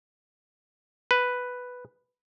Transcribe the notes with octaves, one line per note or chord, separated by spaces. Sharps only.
B4